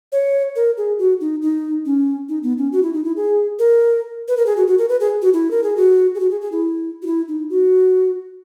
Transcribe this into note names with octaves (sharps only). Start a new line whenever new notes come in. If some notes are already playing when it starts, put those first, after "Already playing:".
C#5
A#4
G#4
F#4
D#4
D#4
C#4
D#4
B3
C#4
F#4
E4
D#4
E4
G#4
A#4
B4
A#4
G#4
F#4
F#4
A#4
B4
G#4
F#4
E4
A#4
G#4
F#4
G#4
F#4
G#4
G#4
E4
F#4
E4
D#4
F#4